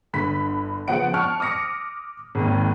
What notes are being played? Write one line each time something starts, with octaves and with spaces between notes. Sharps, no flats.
G1 D3 B5 B6
C#3 F3 B3 F#5 D7
A5 C#6 F6
D6 D#6 A#6 C#7
G#1 D#2